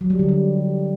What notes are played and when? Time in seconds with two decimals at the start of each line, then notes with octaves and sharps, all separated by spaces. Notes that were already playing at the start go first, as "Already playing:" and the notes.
0.01 F#3
0.10 G3
0.19 D3
0.28 G3